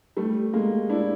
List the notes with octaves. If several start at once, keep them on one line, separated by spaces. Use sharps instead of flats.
G3 A3
G#3 A#3
D4 E4